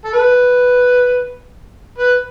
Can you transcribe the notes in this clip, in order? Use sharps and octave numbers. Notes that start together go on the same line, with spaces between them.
A4
B4
B4